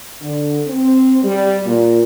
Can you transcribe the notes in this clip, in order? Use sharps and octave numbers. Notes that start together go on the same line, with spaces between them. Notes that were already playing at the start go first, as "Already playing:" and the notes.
D3
C4
G3
A#2